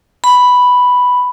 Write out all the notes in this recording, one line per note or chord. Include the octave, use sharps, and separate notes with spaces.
B5